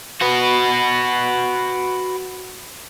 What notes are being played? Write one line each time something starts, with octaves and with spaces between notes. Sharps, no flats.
F#4 B4